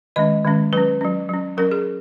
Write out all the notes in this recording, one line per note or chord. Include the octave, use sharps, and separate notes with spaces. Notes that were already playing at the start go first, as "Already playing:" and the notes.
D#3 G#3 C#4 D#5
D#3 G#3 C#4
F#3 C#4 B4
F#3 C#4
F#3 C#4
F#3 C#4 A#4
G#4